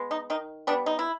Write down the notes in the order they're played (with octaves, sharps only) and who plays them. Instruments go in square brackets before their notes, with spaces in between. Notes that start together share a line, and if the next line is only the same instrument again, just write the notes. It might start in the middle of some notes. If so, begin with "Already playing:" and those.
Already playing: [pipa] G#3 B3
D#4
D#3 D#4
G3 B3 D4
D#4
E4